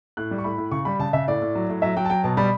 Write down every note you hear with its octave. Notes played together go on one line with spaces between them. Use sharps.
A2 F#6
G3
C#6
A2 B5
A2
C#3 C#6
G3 B5
C#3 A5
C#3 E5
A2 D5
A2
F#3
A2
F#3 E5
F#3 G5
A5
F#3 G5
B2 A5
G3 B5